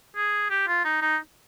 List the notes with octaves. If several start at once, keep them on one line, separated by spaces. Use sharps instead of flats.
G#4
G4
F4
D#4
D#4